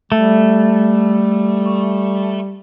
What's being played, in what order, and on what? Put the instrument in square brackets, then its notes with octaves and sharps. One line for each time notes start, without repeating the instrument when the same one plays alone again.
[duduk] G3 [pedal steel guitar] A3